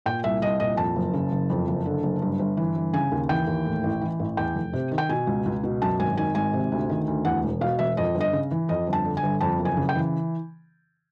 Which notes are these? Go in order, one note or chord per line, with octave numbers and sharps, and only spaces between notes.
A#2 G5
C2 E5
C2 D#5
A#2 D#5
F2 A5
F#1
C#3
F#1
F2
F#1
D3
F#1
G2
G1
E3
G1
C#3 G#5
D#2
E3 G5
D#2
A2
A1
E3
A1
E2 G5
F1
C3
D#3
G5
B2 G#5
C#2
C#2
B2
F#2 A5
G#1 G#5
D#3 G#5
G#1 G#5
C3
D2
D#3
D2
E2 F#5
E1
B2 F5
E1 E5
F2 D#5
G1
D#5
C#3
E3
F2 D#5
G1
A5
D3
G#5
G1
F2 A5
F#1
G#5
C#3
G5
E3